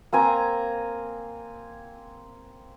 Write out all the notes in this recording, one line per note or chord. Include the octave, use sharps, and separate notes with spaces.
A#3 C4 G#5 A#5